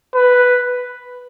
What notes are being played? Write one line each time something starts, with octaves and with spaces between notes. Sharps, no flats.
B4